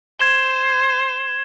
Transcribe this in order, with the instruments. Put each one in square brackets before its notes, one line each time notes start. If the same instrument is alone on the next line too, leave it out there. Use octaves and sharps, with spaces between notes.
[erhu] C5 [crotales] G#6 E7 G7